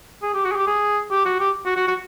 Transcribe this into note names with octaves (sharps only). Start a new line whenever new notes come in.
G#4
G4
F#4
G#4
G4
G#4
G4
F#4
G4
F#4
F#4
F#4